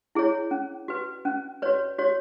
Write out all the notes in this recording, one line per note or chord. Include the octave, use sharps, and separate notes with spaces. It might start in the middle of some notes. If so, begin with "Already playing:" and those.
E4 G#4 C#5
C#4
F#4 B4
C#4
F#4 B4 C#5
F#4 C#5